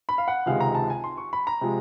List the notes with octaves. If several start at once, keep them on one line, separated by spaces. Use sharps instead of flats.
B5
F5
F#5
C#2 C3 D#3 G#3 F5
A#5
A5
G#5
C6
C#6
B5
A#5
C3 F3 G#3